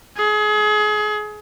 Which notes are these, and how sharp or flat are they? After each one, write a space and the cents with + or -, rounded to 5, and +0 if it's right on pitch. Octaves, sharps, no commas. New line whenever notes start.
G#4 +30